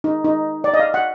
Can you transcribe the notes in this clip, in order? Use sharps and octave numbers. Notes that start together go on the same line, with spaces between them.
D#4
D#4
D5
D#5
F5
F#5